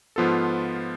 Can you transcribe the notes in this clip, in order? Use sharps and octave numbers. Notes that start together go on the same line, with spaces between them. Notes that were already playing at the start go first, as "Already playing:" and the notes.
G#2 F3 B3 F4 A4